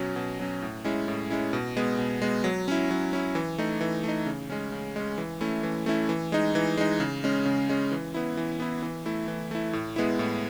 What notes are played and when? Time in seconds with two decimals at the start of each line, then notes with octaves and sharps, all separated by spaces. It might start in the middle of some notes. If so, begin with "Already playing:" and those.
Already playing: B2 F#3 C#4
0.16 B2
0.39 F#3 C#4
0.62 A2
0.84 G#3 C#4 E4
1.08 A2
1.30 G#3 C#4 E4
1.53 B2
1.77 G#3 B3
1.99 B2
2.22 G#3 B3
2.44 F#3
2.68 C#4 E4
2.91 F#3
3.13 C#4 E4
3.35 E3
3.58 A3 D#4
3.81 E3
4.03 A3
4.08 D#4
4.26 C#3
4.50 G#3 C#4
4.72 C#3
4.96 G#3 C#4
5.18 E3
5.41 A3 C#4 E4
5.63 E3
5.86 A3 C#4 E4
6.09 E3
6.32 G#3 D#4
6.55 E3
6.77 G#3 D#4
7.00 C#3
7.24 G#3 C#4
7.46 C#3
7.69 G#3 C#4
7.92 E3
8.14 B3 E4
8.37 E3
8.60 B3 E4
8.83 E3
9.06 A3 E4
9.28 E3
9.51 A3 E4
9.73 A2
9.96 G#3 B3 E4
10.19 A2